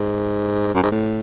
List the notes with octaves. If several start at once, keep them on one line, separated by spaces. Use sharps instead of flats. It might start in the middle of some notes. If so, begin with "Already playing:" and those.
Already playing: G#2
F#2
G#2
A2